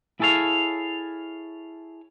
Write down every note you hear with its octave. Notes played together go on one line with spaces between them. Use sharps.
E4 G#4 A4 C#5 F5